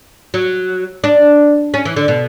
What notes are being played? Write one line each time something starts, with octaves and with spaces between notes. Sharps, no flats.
F#3
D4
C#4
E3
D3
B2